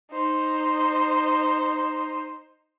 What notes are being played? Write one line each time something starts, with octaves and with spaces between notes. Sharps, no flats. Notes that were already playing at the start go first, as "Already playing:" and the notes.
D#4 C5